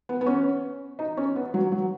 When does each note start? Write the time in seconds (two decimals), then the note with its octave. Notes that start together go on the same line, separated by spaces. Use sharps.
0.09 B3
0.21 B3
0.27 C#4
0.99 D#4
1.17 C#4
1.36 B3
1.54 F#3
1.72 F#3